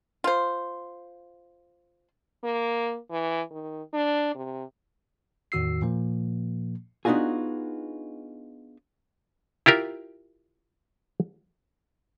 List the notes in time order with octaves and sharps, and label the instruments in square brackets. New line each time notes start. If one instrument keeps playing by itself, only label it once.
[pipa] F4 C5
[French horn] A#3
E3
D#3
D4
C3
[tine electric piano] E2 A2 D#3 F#4 E6 C7
A#2 F3 A#3
[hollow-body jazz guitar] B3 D4 D#4 F4 F#4 G#4
[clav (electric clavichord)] E4 F4 G4 A#4